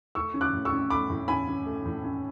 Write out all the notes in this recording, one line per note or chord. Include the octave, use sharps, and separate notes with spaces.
A3 C#6 E6
C#4
D6 F#6
A2
C#6 E6
C#4
A3 B5 D6
A2
C#4 G#5 B5
C#4
A3
A2
C#4